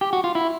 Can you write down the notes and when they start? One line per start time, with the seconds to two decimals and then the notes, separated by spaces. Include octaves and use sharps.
0.01 G4
0.13 F#4
0.24 F4
0.35 E4